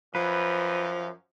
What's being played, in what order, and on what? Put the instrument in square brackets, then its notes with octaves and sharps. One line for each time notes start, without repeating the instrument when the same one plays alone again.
[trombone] F#2 [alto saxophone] F3 [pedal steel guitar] B4